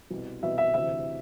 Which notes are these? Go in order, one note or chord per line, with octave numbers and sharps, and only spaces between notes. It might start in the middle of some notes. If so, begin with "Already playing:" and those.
C2 B2
C2 B2 E5
E5
D2 C3 E3 E5